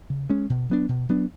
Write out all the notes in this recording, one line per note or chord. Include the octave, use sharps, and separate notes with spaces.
C#3
G#3 C#4
B2
F#3 B3 D4
B2
F#3 B3 D4